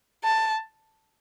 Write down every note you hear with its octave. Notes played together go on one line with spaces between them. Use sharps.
A5